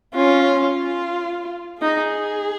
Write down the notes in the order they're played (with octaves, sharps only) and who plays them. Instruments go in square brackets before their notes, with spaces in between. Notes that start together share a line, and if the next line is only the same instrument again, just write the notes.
[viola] C#4 [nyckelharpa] F4
[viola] F4
[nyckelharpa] D#4 [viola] G#4